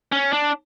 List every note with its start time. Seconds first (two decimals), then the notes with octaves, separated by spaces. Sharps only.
0.12 C#4
0.33 D4